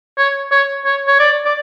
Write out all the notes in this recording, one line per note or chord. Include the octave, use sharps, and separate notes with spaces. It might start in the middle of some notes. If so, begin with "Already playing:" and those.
C#5
C#5
C#5
C#5
D5
D5